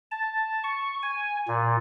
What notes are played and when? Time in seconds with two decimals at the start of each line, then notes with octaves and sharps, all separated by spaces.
0.11 A5
0.64 C#6
1.03 G#5
1.48 A#2